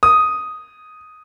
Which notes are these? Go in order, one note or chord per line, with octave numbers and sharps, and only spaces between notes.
D#6